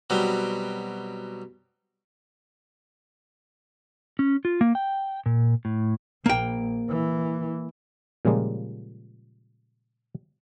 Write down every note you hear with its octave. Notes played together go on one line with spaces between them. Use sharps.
B2 F#3 G3 C4
C#4
F4
A#3
G5
A#2
A2
A#1 A#3 G5
E3
A#2 C#3 F3 G3 G#3 A#3